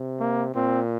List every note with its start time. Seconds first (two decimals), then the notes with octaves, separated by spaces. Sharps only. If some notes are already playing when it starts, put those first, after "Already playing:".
Already playing: C3
0.20 A#3
0.55 A#2 C4